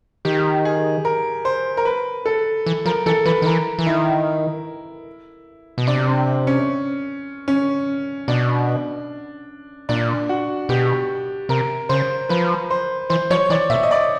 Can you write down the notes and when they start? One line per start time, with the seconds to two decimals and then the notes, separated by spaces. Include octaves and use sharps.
0.25 D#3 G4
0.65 G#4
1.05 A#4
1.45 C5
1.77 A#4
1.85 B4
2.26 A4
2.66 E3
2.86 F3 A#4
3.06 E3 A4
3.25 E3 B4
3.42 D#3
3.46 E3 A#4
3.79 E3
3.86 D#3 E4
5.78 B2
5.87 C3 D4
6.07 C4
6.47 C#4
7.48 C#4
8.28 B2 D4
9.89 A#2 D4
10.29 F#4
10.69 B2 G4
11.49 C3 A#4
11.89 C#3 C5
12.29 F3 B4
12.70 C5
13.10 E3 C5
13.30 F3 C#5
13.50 E3 D5
13.70 A#2 E5
13.83 D#5
13.91 D5